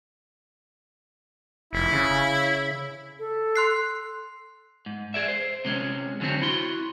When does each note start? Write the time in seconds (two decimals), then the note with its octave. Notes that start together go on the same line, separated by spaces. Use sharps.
1.73 F1 E4
1.92 C#3
3.19 A4
3.56 C6 F#6 C7
4.86 G#2
5.14 G#4 D5 E5
5.28 C5
5.65 C3 G#3 C#4
6.20 F#2 D3 F#3 G3 C4 C#4
6.42 E4 F#4 C6